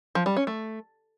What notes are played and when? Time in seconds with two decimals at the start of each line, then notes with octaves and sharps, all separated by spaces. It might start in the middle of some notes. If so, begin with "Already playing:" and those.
0.15 F3
0.26 G3
0.36 C#4
0.47 A3